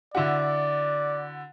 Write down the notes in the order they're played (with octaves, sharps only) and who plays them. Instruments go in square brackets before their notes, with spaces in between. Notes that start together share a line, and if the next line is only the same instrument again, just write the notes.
[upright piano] D3 E4 F#4 [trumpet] D5